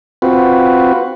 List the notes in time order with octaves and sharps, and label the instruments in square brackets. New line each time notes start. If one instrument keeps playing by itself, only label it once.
[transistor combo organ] C4 F4 F#4 B4